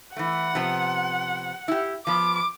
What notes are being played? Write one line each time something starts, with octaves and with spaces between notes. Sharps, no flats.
E3 A3 F#5
C3 F3 B3
E4 G4
F3 B3 D6